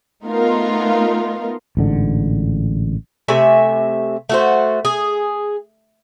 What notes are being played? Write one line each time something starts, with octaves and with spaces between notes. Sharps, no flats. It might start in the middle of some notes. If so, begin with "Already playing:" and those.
A3 B3 D#4 F4 A#4
A1 G#2 D3
C3 A3 E5 G#5
A3 F#4 C5
G#4